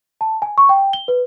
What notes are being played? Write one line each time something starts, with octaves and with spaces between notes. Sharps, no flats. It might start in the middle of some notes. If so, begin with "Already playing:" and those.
A5
G#5
C#6
G5
G7
B4